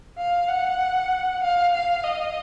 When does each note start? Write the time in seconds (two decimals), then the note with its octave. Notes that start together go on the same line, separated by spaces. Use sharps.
0.18 F5
0.49 F#5
1.43 F5
1.73 F5
2.04 D#5